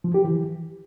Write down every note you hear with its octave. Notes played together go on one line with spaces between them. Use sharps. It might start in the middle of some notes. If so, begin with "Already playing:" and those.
F3
G4
E3